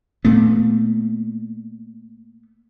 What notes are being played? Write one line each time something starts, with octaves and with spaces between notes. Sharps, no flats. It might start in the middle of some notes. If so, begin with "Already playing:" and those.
A#2 A3 B3